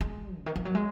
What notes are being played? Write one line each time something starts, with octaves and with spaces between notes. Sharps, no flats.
G#3
C#3
D#3
F3
F#3
G#3